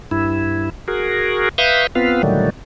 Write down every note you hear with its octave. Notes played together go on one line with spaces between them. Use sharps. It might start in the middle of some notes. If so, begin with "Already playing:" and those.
G2 E4
F#4 G#4 A#4
B4 E5 F5 C#6 D#6 G6
B3 C4 F4 B4 F5
A#2 D3 D#3 F#3 G3 A3